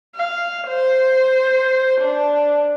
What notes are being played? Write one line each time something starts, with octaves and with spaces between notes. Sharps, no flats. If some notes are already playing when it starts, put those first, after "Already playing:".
F5
C5
D4